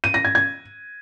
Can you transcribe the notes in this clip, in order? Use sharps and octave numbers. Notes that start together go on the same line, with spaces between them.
D#7
A#6
G#6
G#6